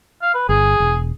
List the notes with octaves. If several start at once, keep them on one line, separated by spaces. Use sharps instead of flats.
F5
B4
G1 G#4
E1